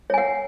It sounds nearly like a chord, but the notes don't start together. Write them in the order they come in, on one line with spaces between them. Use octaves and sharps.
C#5 G#5 F#5